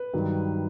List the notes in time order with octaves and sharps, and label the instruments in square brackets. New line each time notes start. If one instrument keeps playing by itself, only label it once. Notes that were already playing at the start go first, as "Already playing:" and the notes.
Already playing: [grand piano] B4
G2 D#3 F#3